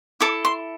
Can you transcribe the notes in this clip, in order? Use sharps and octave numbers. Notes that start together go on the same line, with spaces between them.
E4 A4 D6
C6